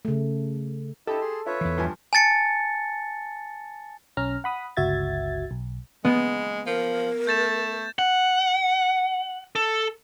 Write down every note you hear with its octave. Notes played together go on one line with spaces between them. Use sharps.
C#3 A3
E4 G4 A4 D#5 A5
G#4 C6
F4 B4 C#5 E5
E2 E3
G2 F3 G#5
G#5 A5 A6 C#7
B1 C#4 A#5 F6
F#5 B5 D#6
G1 C#2 F#4 E5 G#6 A6
B1
G#3 B3
F3 A#4
A3 G6 A6 E7
F#5
A4